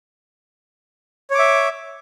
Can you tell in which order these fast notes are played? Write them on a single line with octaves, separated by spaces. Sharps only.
C#5 D6 E5